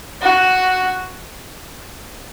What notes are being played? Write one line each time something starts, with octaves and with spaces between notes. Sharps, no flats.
F#4